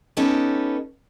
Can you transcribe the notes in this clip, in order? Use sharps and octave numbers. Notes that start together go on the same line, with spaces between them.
B3 C#4 D#4 G4 A4 B4